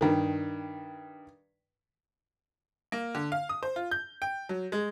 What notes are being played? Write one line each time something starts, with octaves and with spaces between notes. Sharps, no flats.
G2 D#3
A#3
D3
F5
D#6
C5
F4
G6
G5
F#3
G#3